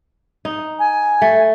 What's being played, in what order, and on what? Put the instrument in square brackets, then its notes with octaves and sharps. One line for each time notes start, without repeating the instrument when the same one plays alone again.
[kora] D#4
[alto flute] G#5
[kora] A3